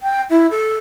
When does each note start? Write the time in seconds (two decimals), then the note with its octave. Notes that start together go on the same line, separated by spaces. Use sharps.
0.03 G5
0.30 E4
0.51 A4